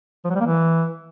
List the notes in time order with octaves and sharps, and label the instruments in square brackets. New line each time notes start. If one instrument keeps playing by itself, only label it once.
[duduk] F3
F#3
G3
A#3
E3